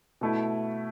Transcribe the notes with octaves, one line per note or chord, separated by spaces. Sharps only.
B2 A3 E4